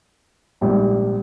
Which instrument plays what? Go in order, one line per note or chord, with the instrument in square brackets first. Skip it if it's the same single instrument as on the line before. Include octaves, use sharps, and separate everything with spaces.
[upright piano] A#1 G#2 G3